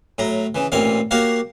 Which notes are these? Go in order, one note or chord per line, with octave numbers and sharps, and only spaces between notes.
A2 F#3 A#5
C#3 E3
A1 A#2 C4 C#5 F5
A#3 F#4 G4 A#4 C#5 F5